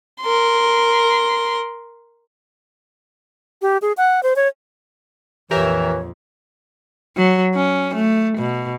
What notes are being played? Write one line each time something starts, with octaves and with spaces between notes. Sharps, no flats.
A#4 C6
G4
G#4
F#5
C5
C#5
A#1 F2 E3 G4 A#4 C#5 E5
F#3
C#4
A3
B2